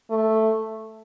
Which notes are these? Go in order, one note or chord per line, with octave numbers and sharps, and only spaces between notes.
A3